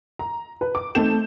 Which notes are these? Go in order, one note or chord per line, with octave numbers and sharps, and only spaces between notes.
A#5
B4
D6
A3 C4 D#4 A5 G6 E7